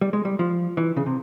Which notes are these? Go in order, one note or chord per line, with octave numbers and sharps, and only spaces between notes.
G3
G#3
G3
F3
E3
C#3
C3